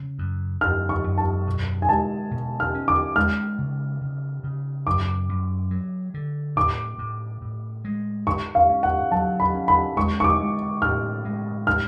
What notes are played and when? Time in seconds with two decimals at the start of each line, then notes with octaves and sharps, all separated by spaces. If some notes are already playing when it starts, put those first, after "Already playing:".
Already playing: C#3
0.19 F#2
0.61 F#2 F6
0.89 C#6
1.04 F#2
1.18 A5
1.47 B2
1.82 G#5
1.89 G#3 A5
2.31 B2
2.60 F6
2.74 C#4
2.88 D6
3.16 G#3 F6
3.58 C#3
4.01 C#3
4.44 C#3
4.87 F#2 D6
5.29 F#2
5.71 F#3
6.14 D3
6.56 A2 D6
6.99 A2
7.42 A2
7.85 G#3
8.27 G#2 C#6
8.55 F5
8.70 C#4
8.83 F#5
9.11 F#3 A5
9.40 B5
9.54 C#4
9.68 B5
9.97 G#3 C#6
10.20 C#6
10.24 D6
10.39 G#3
10.82 A2 F6
11.25 G#3
11.67 F6